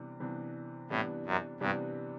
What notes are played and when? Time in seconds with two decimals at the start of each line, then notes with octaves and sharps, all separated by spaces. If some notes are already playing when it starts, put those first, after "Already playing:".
Already playing: C3 E3 G3 B3 D4
0.20 C3 E3 G3 B3 D4
0.90 A2 C3 E3 G3 B3 D4
1.26 F#2
1.60 G2 C3 E3 G3 B3 D4